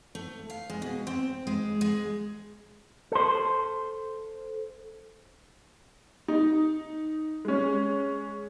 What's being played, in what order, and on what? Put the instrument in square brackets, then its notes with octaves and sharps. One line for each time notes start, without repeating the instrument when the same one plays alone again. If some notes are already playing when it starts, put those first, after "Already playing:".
[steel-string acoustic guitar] A3
F5
G#3
B2
C4
G#3
G#3
[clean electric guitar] A4 C5
[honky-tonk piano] D#4
G#3 C#4